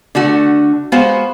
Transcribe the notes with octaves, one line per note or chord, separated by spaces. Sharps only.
D3 A3 F#4
G#3 B3 F#4 C5 F5